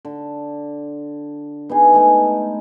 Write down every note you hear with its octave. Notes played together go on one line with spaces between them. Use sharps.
D3
B3 D#4 G#4
G#3 A3 G#5